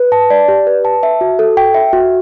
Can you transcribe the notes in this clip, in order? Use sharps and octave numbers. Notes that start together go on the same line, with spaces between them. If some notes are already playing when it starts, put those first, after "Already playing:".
Already playing: B4
A5
D5
G4
B4
A5
E5
F#4
A4
G5
E5
F#4